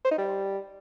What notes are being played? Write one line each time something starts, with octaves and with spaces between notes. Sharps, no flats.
C5
D#4
G3